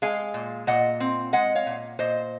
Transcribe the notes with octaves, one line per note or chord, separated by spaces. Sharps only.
G#3 F5 G#5
A#2
A#2 D#5 F#5
C4
G#3 D#5 F#5
C#5 F5
A#2
A#2 C5 D#5